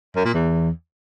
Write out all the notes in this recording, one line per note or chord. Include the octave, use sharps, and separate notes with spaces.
F#2
A#2
E2